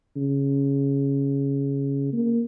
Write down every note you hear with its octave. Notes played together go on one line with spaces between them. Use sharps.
C#3
A#3